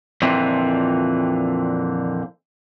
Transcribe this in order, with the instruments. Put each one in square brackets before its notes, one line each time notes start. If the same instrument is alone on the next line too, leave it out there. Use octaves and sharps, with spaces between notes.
[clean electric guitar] F2 A#2 D3 E3 C4